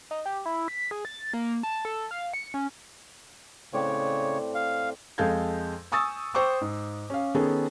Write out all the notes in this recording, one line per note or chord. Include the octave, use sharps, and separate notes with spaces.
D#4
G4
E4
B6
G#4
A6
A#3
A5
A4
F5
C#7
C#4
A2 C#3 C4 C#5 D5
F5
F2 G#3 A4 F5 G6 G#6
G#5 C#6 D#6 E6 A6
C5 G5 C#6 D6 E6
G#2
C#4 F5
D#3 B3 C#4 G#4 A4